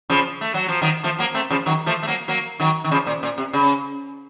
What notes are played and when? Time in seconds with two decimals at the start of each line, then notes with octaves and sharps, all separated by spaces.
0.10 C#3 F3
0.41 A3
0.54 F#3
0.68 F3
0.82 D#3 F#3
1.03 F3 A3
1.19 F#3 A#3
1.35 A3 C4
1.50 C#3 F3
1.66 D#3 F#3
1.86 F3 A3
2.03 A3
2.07 F#3 A#3
2.28 F#3 A#3
2.60 D#3 F#3
2.84 D#3
2.91 C#3 F3
3.06 A#2
3.23 A#2
3.38 C3
3.53 C#3